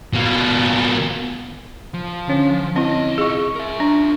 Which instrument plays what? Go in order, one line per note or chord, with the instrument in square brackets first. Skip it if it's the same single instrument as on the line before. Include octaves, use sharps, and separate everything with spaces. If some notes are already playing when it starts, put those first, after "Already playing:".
[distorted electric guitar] B2 A#3
[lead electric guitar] F3
[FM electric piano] D3 C#4
[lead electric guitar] B1 D#5 [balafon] C4 E4
[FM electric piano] F4 C#6 [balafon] G#4
[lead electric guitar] A#4 E5
[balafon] D4